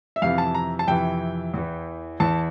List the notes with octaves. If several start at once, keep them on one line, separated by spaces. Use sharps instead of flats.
E5
F2 C3 E3 F5
A5
A#5
A5
F2 C3 E3 G5
E2 E3
E2 E3 A5